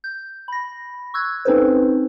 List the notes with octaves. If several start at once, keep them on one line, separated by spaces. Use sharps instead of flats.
G6
B5 A#6
C#6 E6 F#6 G#6
C4 C#4 D#4 A4 B4 C5